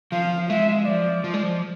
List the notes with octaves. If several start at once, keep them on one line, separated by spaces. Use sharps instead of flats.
F3 F5
G#3 E5
F3 D5
F3
G#3
F3